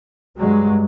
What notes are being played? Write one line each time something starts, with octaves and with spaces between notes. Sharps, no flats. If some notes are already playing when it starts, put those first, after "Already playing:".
G2 F#3 G#3